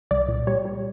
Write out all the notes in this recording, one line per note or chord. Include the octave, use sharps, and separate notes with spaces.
C2 D5
A#2
G3 C#5
G3